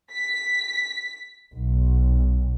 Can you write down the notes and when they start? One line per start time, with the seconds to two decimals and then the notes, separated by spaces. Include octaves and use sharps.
0.11 B6
1.52 B1